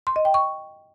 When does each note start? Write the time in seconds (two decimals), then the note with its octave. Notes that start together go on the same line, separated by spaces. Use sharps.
0.07 C6
0.16 D#5
0.25 G5
0.34 C#6